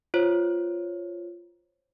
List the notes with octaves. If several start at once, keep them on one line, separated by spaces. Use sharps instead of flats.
F4 C5 C#5